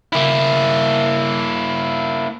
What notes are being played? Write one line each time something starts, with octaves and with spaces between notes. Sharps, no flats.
A#3 E4